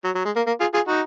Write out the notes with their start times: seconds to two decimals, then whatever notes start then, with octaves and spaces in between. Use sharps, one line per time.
0.04 F#3
0.15 F#3
0.25 G#3
0.36 A#3
0.47 A#3
0.60 F4 G#4
0.74 F4 G#4
0.87 D#4 F#4